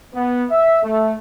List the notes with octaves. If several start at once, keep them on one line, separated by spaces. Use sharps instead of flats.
B3
E5
A3